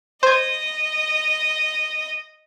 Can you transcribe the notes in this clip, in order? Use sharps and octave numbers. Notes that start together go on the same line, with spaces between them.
C5 D#5 G#6